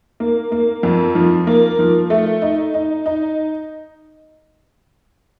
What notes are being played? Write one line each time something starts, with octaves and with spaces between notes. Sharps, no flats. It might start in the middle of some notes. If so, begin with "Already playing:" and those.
A#3
A#3
F2
F3
A#3
F3
A3
D#4
D#4
D#4